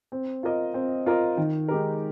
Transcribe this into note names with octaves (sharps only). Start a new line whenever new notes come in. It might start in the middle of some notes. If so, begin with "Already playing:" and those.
C4
F4 A#4 D#5
C4
F4 A#4 D#5
D#3
G#3 D#4 G4 A#4